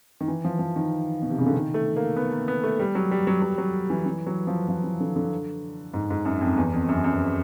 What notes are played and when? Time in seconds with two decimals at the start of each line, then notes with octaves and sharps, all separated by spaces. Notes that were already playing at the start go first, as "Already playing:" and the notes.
0.21 D#3
0.28 E3
0.44 F3
0.59 F3
0.76 D#3
1.22 B2
1.30 C3
1.39 C#3
1.46 D3
1.54 D#3
1.74 A3
1.96 A#3
2.16 B3
2.32 A#3
2.48 B3
2.63 A3
2.79 G3
2.95 F#3
3.11 G3
3.27 F#3
3.42 F#3
3.58 F#3
3.90 E3
4.06 E3
4.27 F#3
4.47 F3
4.68 F3
4.84 E3
5.00 D3
5.16 D3
5.94 G#2
6.10 G#2
6.25 F#2
6.41 F2
6.57 E2
6.73 F2
6.89 F#2
7.04 F#2